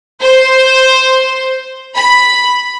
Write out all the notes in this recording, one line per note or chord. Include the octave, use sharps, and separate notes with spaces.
C5
B5